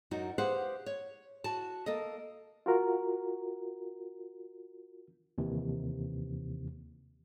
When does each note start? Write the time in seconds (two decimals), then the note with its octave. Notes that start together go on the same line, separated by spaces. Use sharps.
0.11 F#2 D#4 F#4
0.38 G4 G#4 B4 C5 F5 F#5
0.86 C#5
1.44 F#4 A5
1.86 A#3 A4 D#5
2.66 F4 F#4 A#4
5.38 D#2 C3 E3